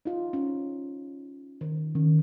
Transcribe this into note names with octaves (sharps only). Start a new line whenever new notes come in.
D#4 F4
C#4
D#3
D#3 C#4